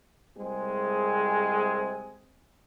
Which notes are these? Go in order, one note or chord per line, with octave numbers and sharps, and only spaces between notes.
C2 G#3 C4 G#4